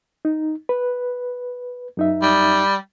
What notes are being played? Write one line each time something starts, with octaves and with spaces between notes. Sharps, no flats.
D#4
B4
F#2 D#4 E5
G3